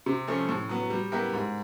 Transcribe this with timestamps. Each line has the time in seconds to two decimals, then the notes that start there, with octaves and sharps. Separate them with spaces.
0.06 C3
0.27 F3 A3 C#4
0.49 A2
0.69 F#3 B3
0.90 G3
1.12 B3 E4 G4 A#4
1.33 G#2